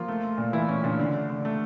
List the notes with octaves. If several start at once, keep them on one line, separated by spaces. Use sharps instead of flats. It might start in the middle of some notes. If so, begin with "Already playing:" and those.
Already playing: F3 A#3 F4
A3
A3
A#2
E3 A3 E4
A#2 C#4
A#2 D4
D3
A3
D3
A3